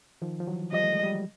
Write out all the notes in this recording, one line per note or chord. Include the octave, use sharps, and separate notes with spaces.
D#3 F3
F3
E3 F#3
F3 G3 D#5
A3
G#3
G3
F#3